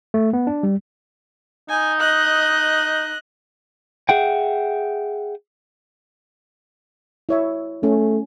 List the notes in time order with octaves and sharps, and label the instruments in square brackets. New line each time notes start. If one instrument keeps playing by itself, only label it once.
[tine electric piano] A3
B3
D4
G3
[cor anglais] D#4 [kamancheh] G#5
[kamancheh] D#5 F#6
[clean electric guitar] G#4 E5 F#5 G5
[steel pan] E4 C#5 E5
[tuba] A3 [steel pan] C#4